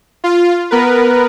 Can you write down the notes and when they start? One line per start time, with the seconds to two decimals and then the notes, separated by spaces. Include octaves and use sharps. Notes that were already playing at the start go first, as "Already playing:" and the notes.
0.24 F4
0.71 B3 A#4 B4